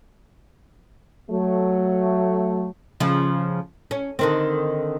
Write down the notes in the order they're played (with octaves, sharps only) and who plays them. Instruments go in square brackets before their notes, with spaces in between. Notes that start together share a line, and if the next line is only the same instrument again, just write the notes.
[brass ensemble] F#3 A3
[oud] C#3 F3
C#4
D3 D#3 C4